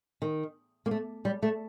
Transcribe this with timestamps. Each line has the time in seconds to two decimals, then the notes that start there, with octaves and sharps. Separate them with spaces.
0.22 D#3
0.86 A#3
0.91 A3
1.25 G3
1.43 A3